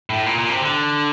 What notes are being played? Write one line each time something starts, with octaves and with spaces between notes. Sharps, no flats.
A2
A#2
A#2
C3
D3